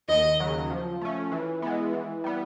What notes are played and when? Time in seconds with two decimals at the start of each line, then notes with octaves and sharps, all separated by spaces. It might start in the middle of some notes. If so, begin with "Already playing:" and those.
0.09 D#2 D#5
0.40 C#3 F#3
0.70 F3
1.01 A3 C#4
1.32 E3
1.62 G#3 B3
1.93 E3
2.24 G3 B3